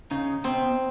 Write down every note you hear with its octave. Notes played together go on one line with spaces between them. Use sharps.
C#3 D#4
B2 C4